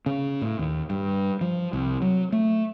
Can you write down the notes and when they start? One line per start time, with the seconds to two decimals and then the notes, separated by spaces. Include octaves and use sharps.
0.06 C#3
0.42 A2
0.59 D#2
0.90 G2
1.41 F3
1.73 C2
2.02 F#3
2.32 A3